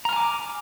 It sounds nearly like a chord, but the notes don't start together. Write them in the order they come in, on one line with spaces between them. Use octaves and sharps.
A#5 F6 G#5 D6